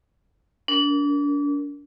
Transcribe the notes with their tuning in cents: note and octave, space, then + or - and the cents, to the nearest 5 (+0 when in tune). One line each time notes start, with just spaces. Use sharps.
D4 -35 A#4 +0